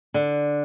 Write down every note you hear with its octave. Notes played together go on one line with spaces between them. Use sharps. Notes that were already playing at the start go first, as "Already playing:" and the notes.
D3